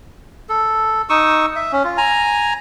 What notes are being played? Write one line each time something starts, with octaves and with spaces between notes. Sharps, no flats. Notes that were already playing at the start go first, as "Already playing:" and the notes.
A4
D#4 C#6 D#6 E6
E5
C#4
F4
G#5 A#5